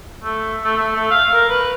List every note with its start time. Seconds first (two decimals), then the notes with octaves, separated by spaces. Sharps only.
0.23 A3
0.64 A3
0.77 A3
0.96 A3
1.11 F5
1.33 A#4
1.49 B4